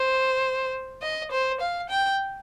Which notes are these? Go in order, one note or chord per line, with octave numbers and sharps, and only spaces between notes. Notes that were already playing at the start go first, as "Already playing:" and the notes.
Already playing: C5
D#5
C5
F5
G5